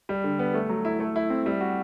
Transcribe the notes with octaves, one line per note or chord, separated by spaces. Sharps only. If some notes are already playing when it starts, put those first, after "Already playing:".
G3
D3
B3
A3
F#3
E4
A3
E4
C4
G3
F#4